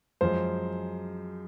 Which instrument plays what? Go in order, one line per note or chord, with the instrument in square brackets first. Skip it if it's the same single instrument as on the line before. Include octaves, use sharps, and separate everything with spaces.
[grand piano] F#2 F3 G#3 C5